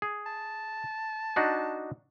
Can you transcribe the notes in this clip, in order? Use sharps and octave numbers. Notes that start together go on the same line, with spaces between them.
G#4
A5
D4 D#4 F#4